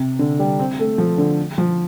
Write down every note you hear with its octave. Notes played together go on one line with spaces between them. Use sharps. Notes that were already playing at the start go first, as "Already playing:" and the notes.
Already playing: C3
D3
G3
C4
A3
F3
D3
F3